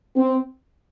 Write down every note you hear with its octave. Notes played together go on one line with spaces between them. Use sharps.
C4